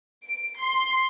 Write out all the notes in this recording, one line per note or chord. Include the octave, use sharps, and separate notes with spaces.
D7
C6